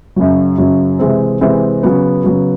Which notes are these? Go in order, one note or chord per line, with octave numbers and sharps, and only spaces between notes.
F#2 C#3 F#3
F#2 C#3 F#3
C3 E3 G#3 C4
C3 E3 G#3 C4
C#3 F#3 B3
C#3 F#3 B3